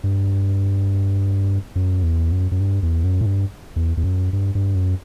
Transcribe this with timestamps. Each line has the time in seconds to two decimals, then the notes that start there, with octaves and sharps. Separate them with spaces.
0.04 G2
1.76 F#2
2.03 E2
2.32 F#2
2.52 F#2
2.60 G2
2.83 E2
3.04 F#2
3.21 A2
3.26 G2
3.76 E2
3.97 E2
4.04 F#2
4.33 G2
4.55 G2
4.75 F#2